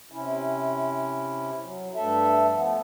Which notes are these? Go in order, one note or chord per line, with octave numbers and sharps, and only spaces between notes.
C3 C#4 E4
F#3
G2 A3 A4 E5
F3 A3 B3